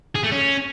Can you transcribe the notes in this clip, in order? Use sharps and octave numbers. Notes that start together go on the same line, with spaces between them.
G#4
A3
C#4